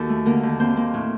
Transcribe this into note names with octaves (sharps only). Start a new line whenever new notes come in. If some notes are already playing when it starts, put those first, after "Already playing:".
Already playing: D#2 F#4 A4
A3
D3 A#3 A#4
D#2
A#3 C4 C5
A#3
A2